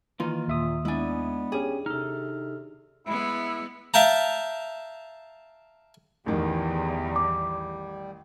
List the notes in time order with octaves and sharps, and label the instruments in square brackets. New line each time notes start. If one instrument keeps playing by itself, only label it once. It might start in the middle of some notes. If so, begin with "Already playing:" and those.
[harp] D#3 [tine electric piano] E3 [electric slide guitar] A#3 F4
[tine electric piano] D#2 E5 D#6 [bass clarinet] A#2
[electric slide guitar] G#3 G#5 [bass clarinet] B3 [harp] D4 E4
[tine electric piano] C#4 G4 [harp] G#4
[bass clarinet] C3 [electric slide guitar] D#4 A4 [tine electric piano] F6
[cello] G#3 B3 [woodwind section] E4
[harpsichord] E5 F5 G5 A5 A#5
[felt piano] A1 D#3 [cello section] E2 [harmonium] G3
[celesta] D6